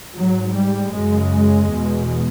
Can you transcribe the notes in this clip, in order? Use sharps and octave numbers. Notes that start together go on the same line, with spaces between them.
G#2 F#3
G3
F#2 C#3 G#3
E2 B2